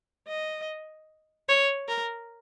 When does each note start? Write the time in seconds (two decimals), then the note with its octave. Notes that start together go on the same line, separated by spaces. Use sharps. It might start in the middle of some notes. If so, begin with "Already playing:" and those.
0.28 D#5
1.48 C#5
1.88 A#4